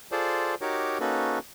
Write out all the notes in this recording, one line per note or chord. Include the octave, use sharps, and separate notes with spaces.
F4 G#4 A4 C5 D5
D#4 F#4 G4 A#4 C#5 D6
A#3 C#4 D#4 F#4 A4 B4